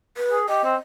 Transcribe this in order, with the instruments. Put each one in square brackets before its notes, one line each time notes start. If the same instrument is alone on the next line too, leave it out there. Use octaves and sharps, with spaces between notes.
[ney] B4
[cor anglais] G#4
[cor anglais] G4 [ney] D#5
[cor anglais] C4